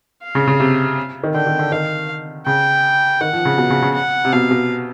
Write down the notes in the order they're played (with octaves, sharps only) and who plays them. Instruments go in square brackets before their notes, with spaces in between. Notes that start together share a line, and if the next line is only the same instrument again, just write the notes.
[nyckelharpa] F5
[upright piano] C#3
C#3
C3
D#3
[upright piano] D3 [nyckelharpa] G5
[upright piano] D#3
D3
[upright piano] D#3 [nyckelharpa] F5
[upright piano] C#3 [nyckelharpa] G5
[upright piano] D#3 [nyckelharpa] F#5
[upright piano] F3
C#3
B2
C#3
C#3
[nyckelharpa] F#5
[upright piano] C3
[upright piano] B2 [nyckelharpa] F5
[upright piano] B2